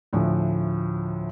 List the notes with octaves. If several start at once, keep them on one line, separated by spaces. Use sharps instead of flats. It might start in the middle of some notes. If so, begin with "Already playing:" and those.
D2 A2 F3